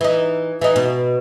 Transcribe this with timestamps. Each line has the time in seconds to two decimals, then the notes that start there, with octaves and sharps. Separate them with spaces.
0.01 E3 D#4
0.61 E3 D#4
0.76 B2